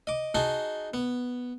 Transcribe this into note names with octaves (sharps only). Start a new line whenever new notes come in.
D#5 D6
D#4 F#4 G#4 A5 C6
B3